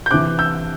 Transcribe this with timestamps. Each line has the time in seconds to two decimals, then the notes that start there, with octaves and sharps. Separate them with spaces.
0.06 G6
0.11 C3 E3 D6 F#6
0.39 E6 G6